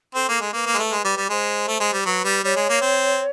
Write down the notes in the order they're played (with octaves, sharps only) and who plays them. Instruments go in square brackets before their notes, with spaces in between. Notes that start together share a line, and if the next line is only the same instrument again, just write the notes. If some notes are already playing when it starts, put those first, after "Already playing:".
[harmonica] C4 [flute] A4
[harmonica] A#3
G#3
[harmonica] A#3 [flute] B4
[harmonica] A#3
G#3
A3
G#3
G3
G3
[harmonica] G#3 [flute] C5
[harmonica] A3
G#3
G3
[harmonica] F#3 [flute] B4
[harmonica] G3
[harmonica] G3 [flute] C#5
[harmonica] G#3
A#3
C4